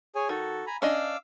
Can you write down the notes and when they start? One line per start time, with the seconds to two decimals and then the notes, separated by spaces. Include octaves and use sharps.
0.15 G#4 C#5 G#5
0.29 D#3 F#4 A4
0.67 G#5 A#5 B5
0.82 C#4 D4 D#5 F5 D6 E6